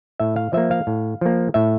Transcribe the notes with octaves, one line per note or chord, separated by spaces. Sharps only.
A2 E5
F5
F3 A#3 E5
F5
A2
F3 A#3
A2 E5